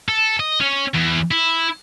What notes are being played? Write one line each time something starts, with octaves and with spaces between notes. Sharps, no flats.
A4
D#5
C#4
E2
E4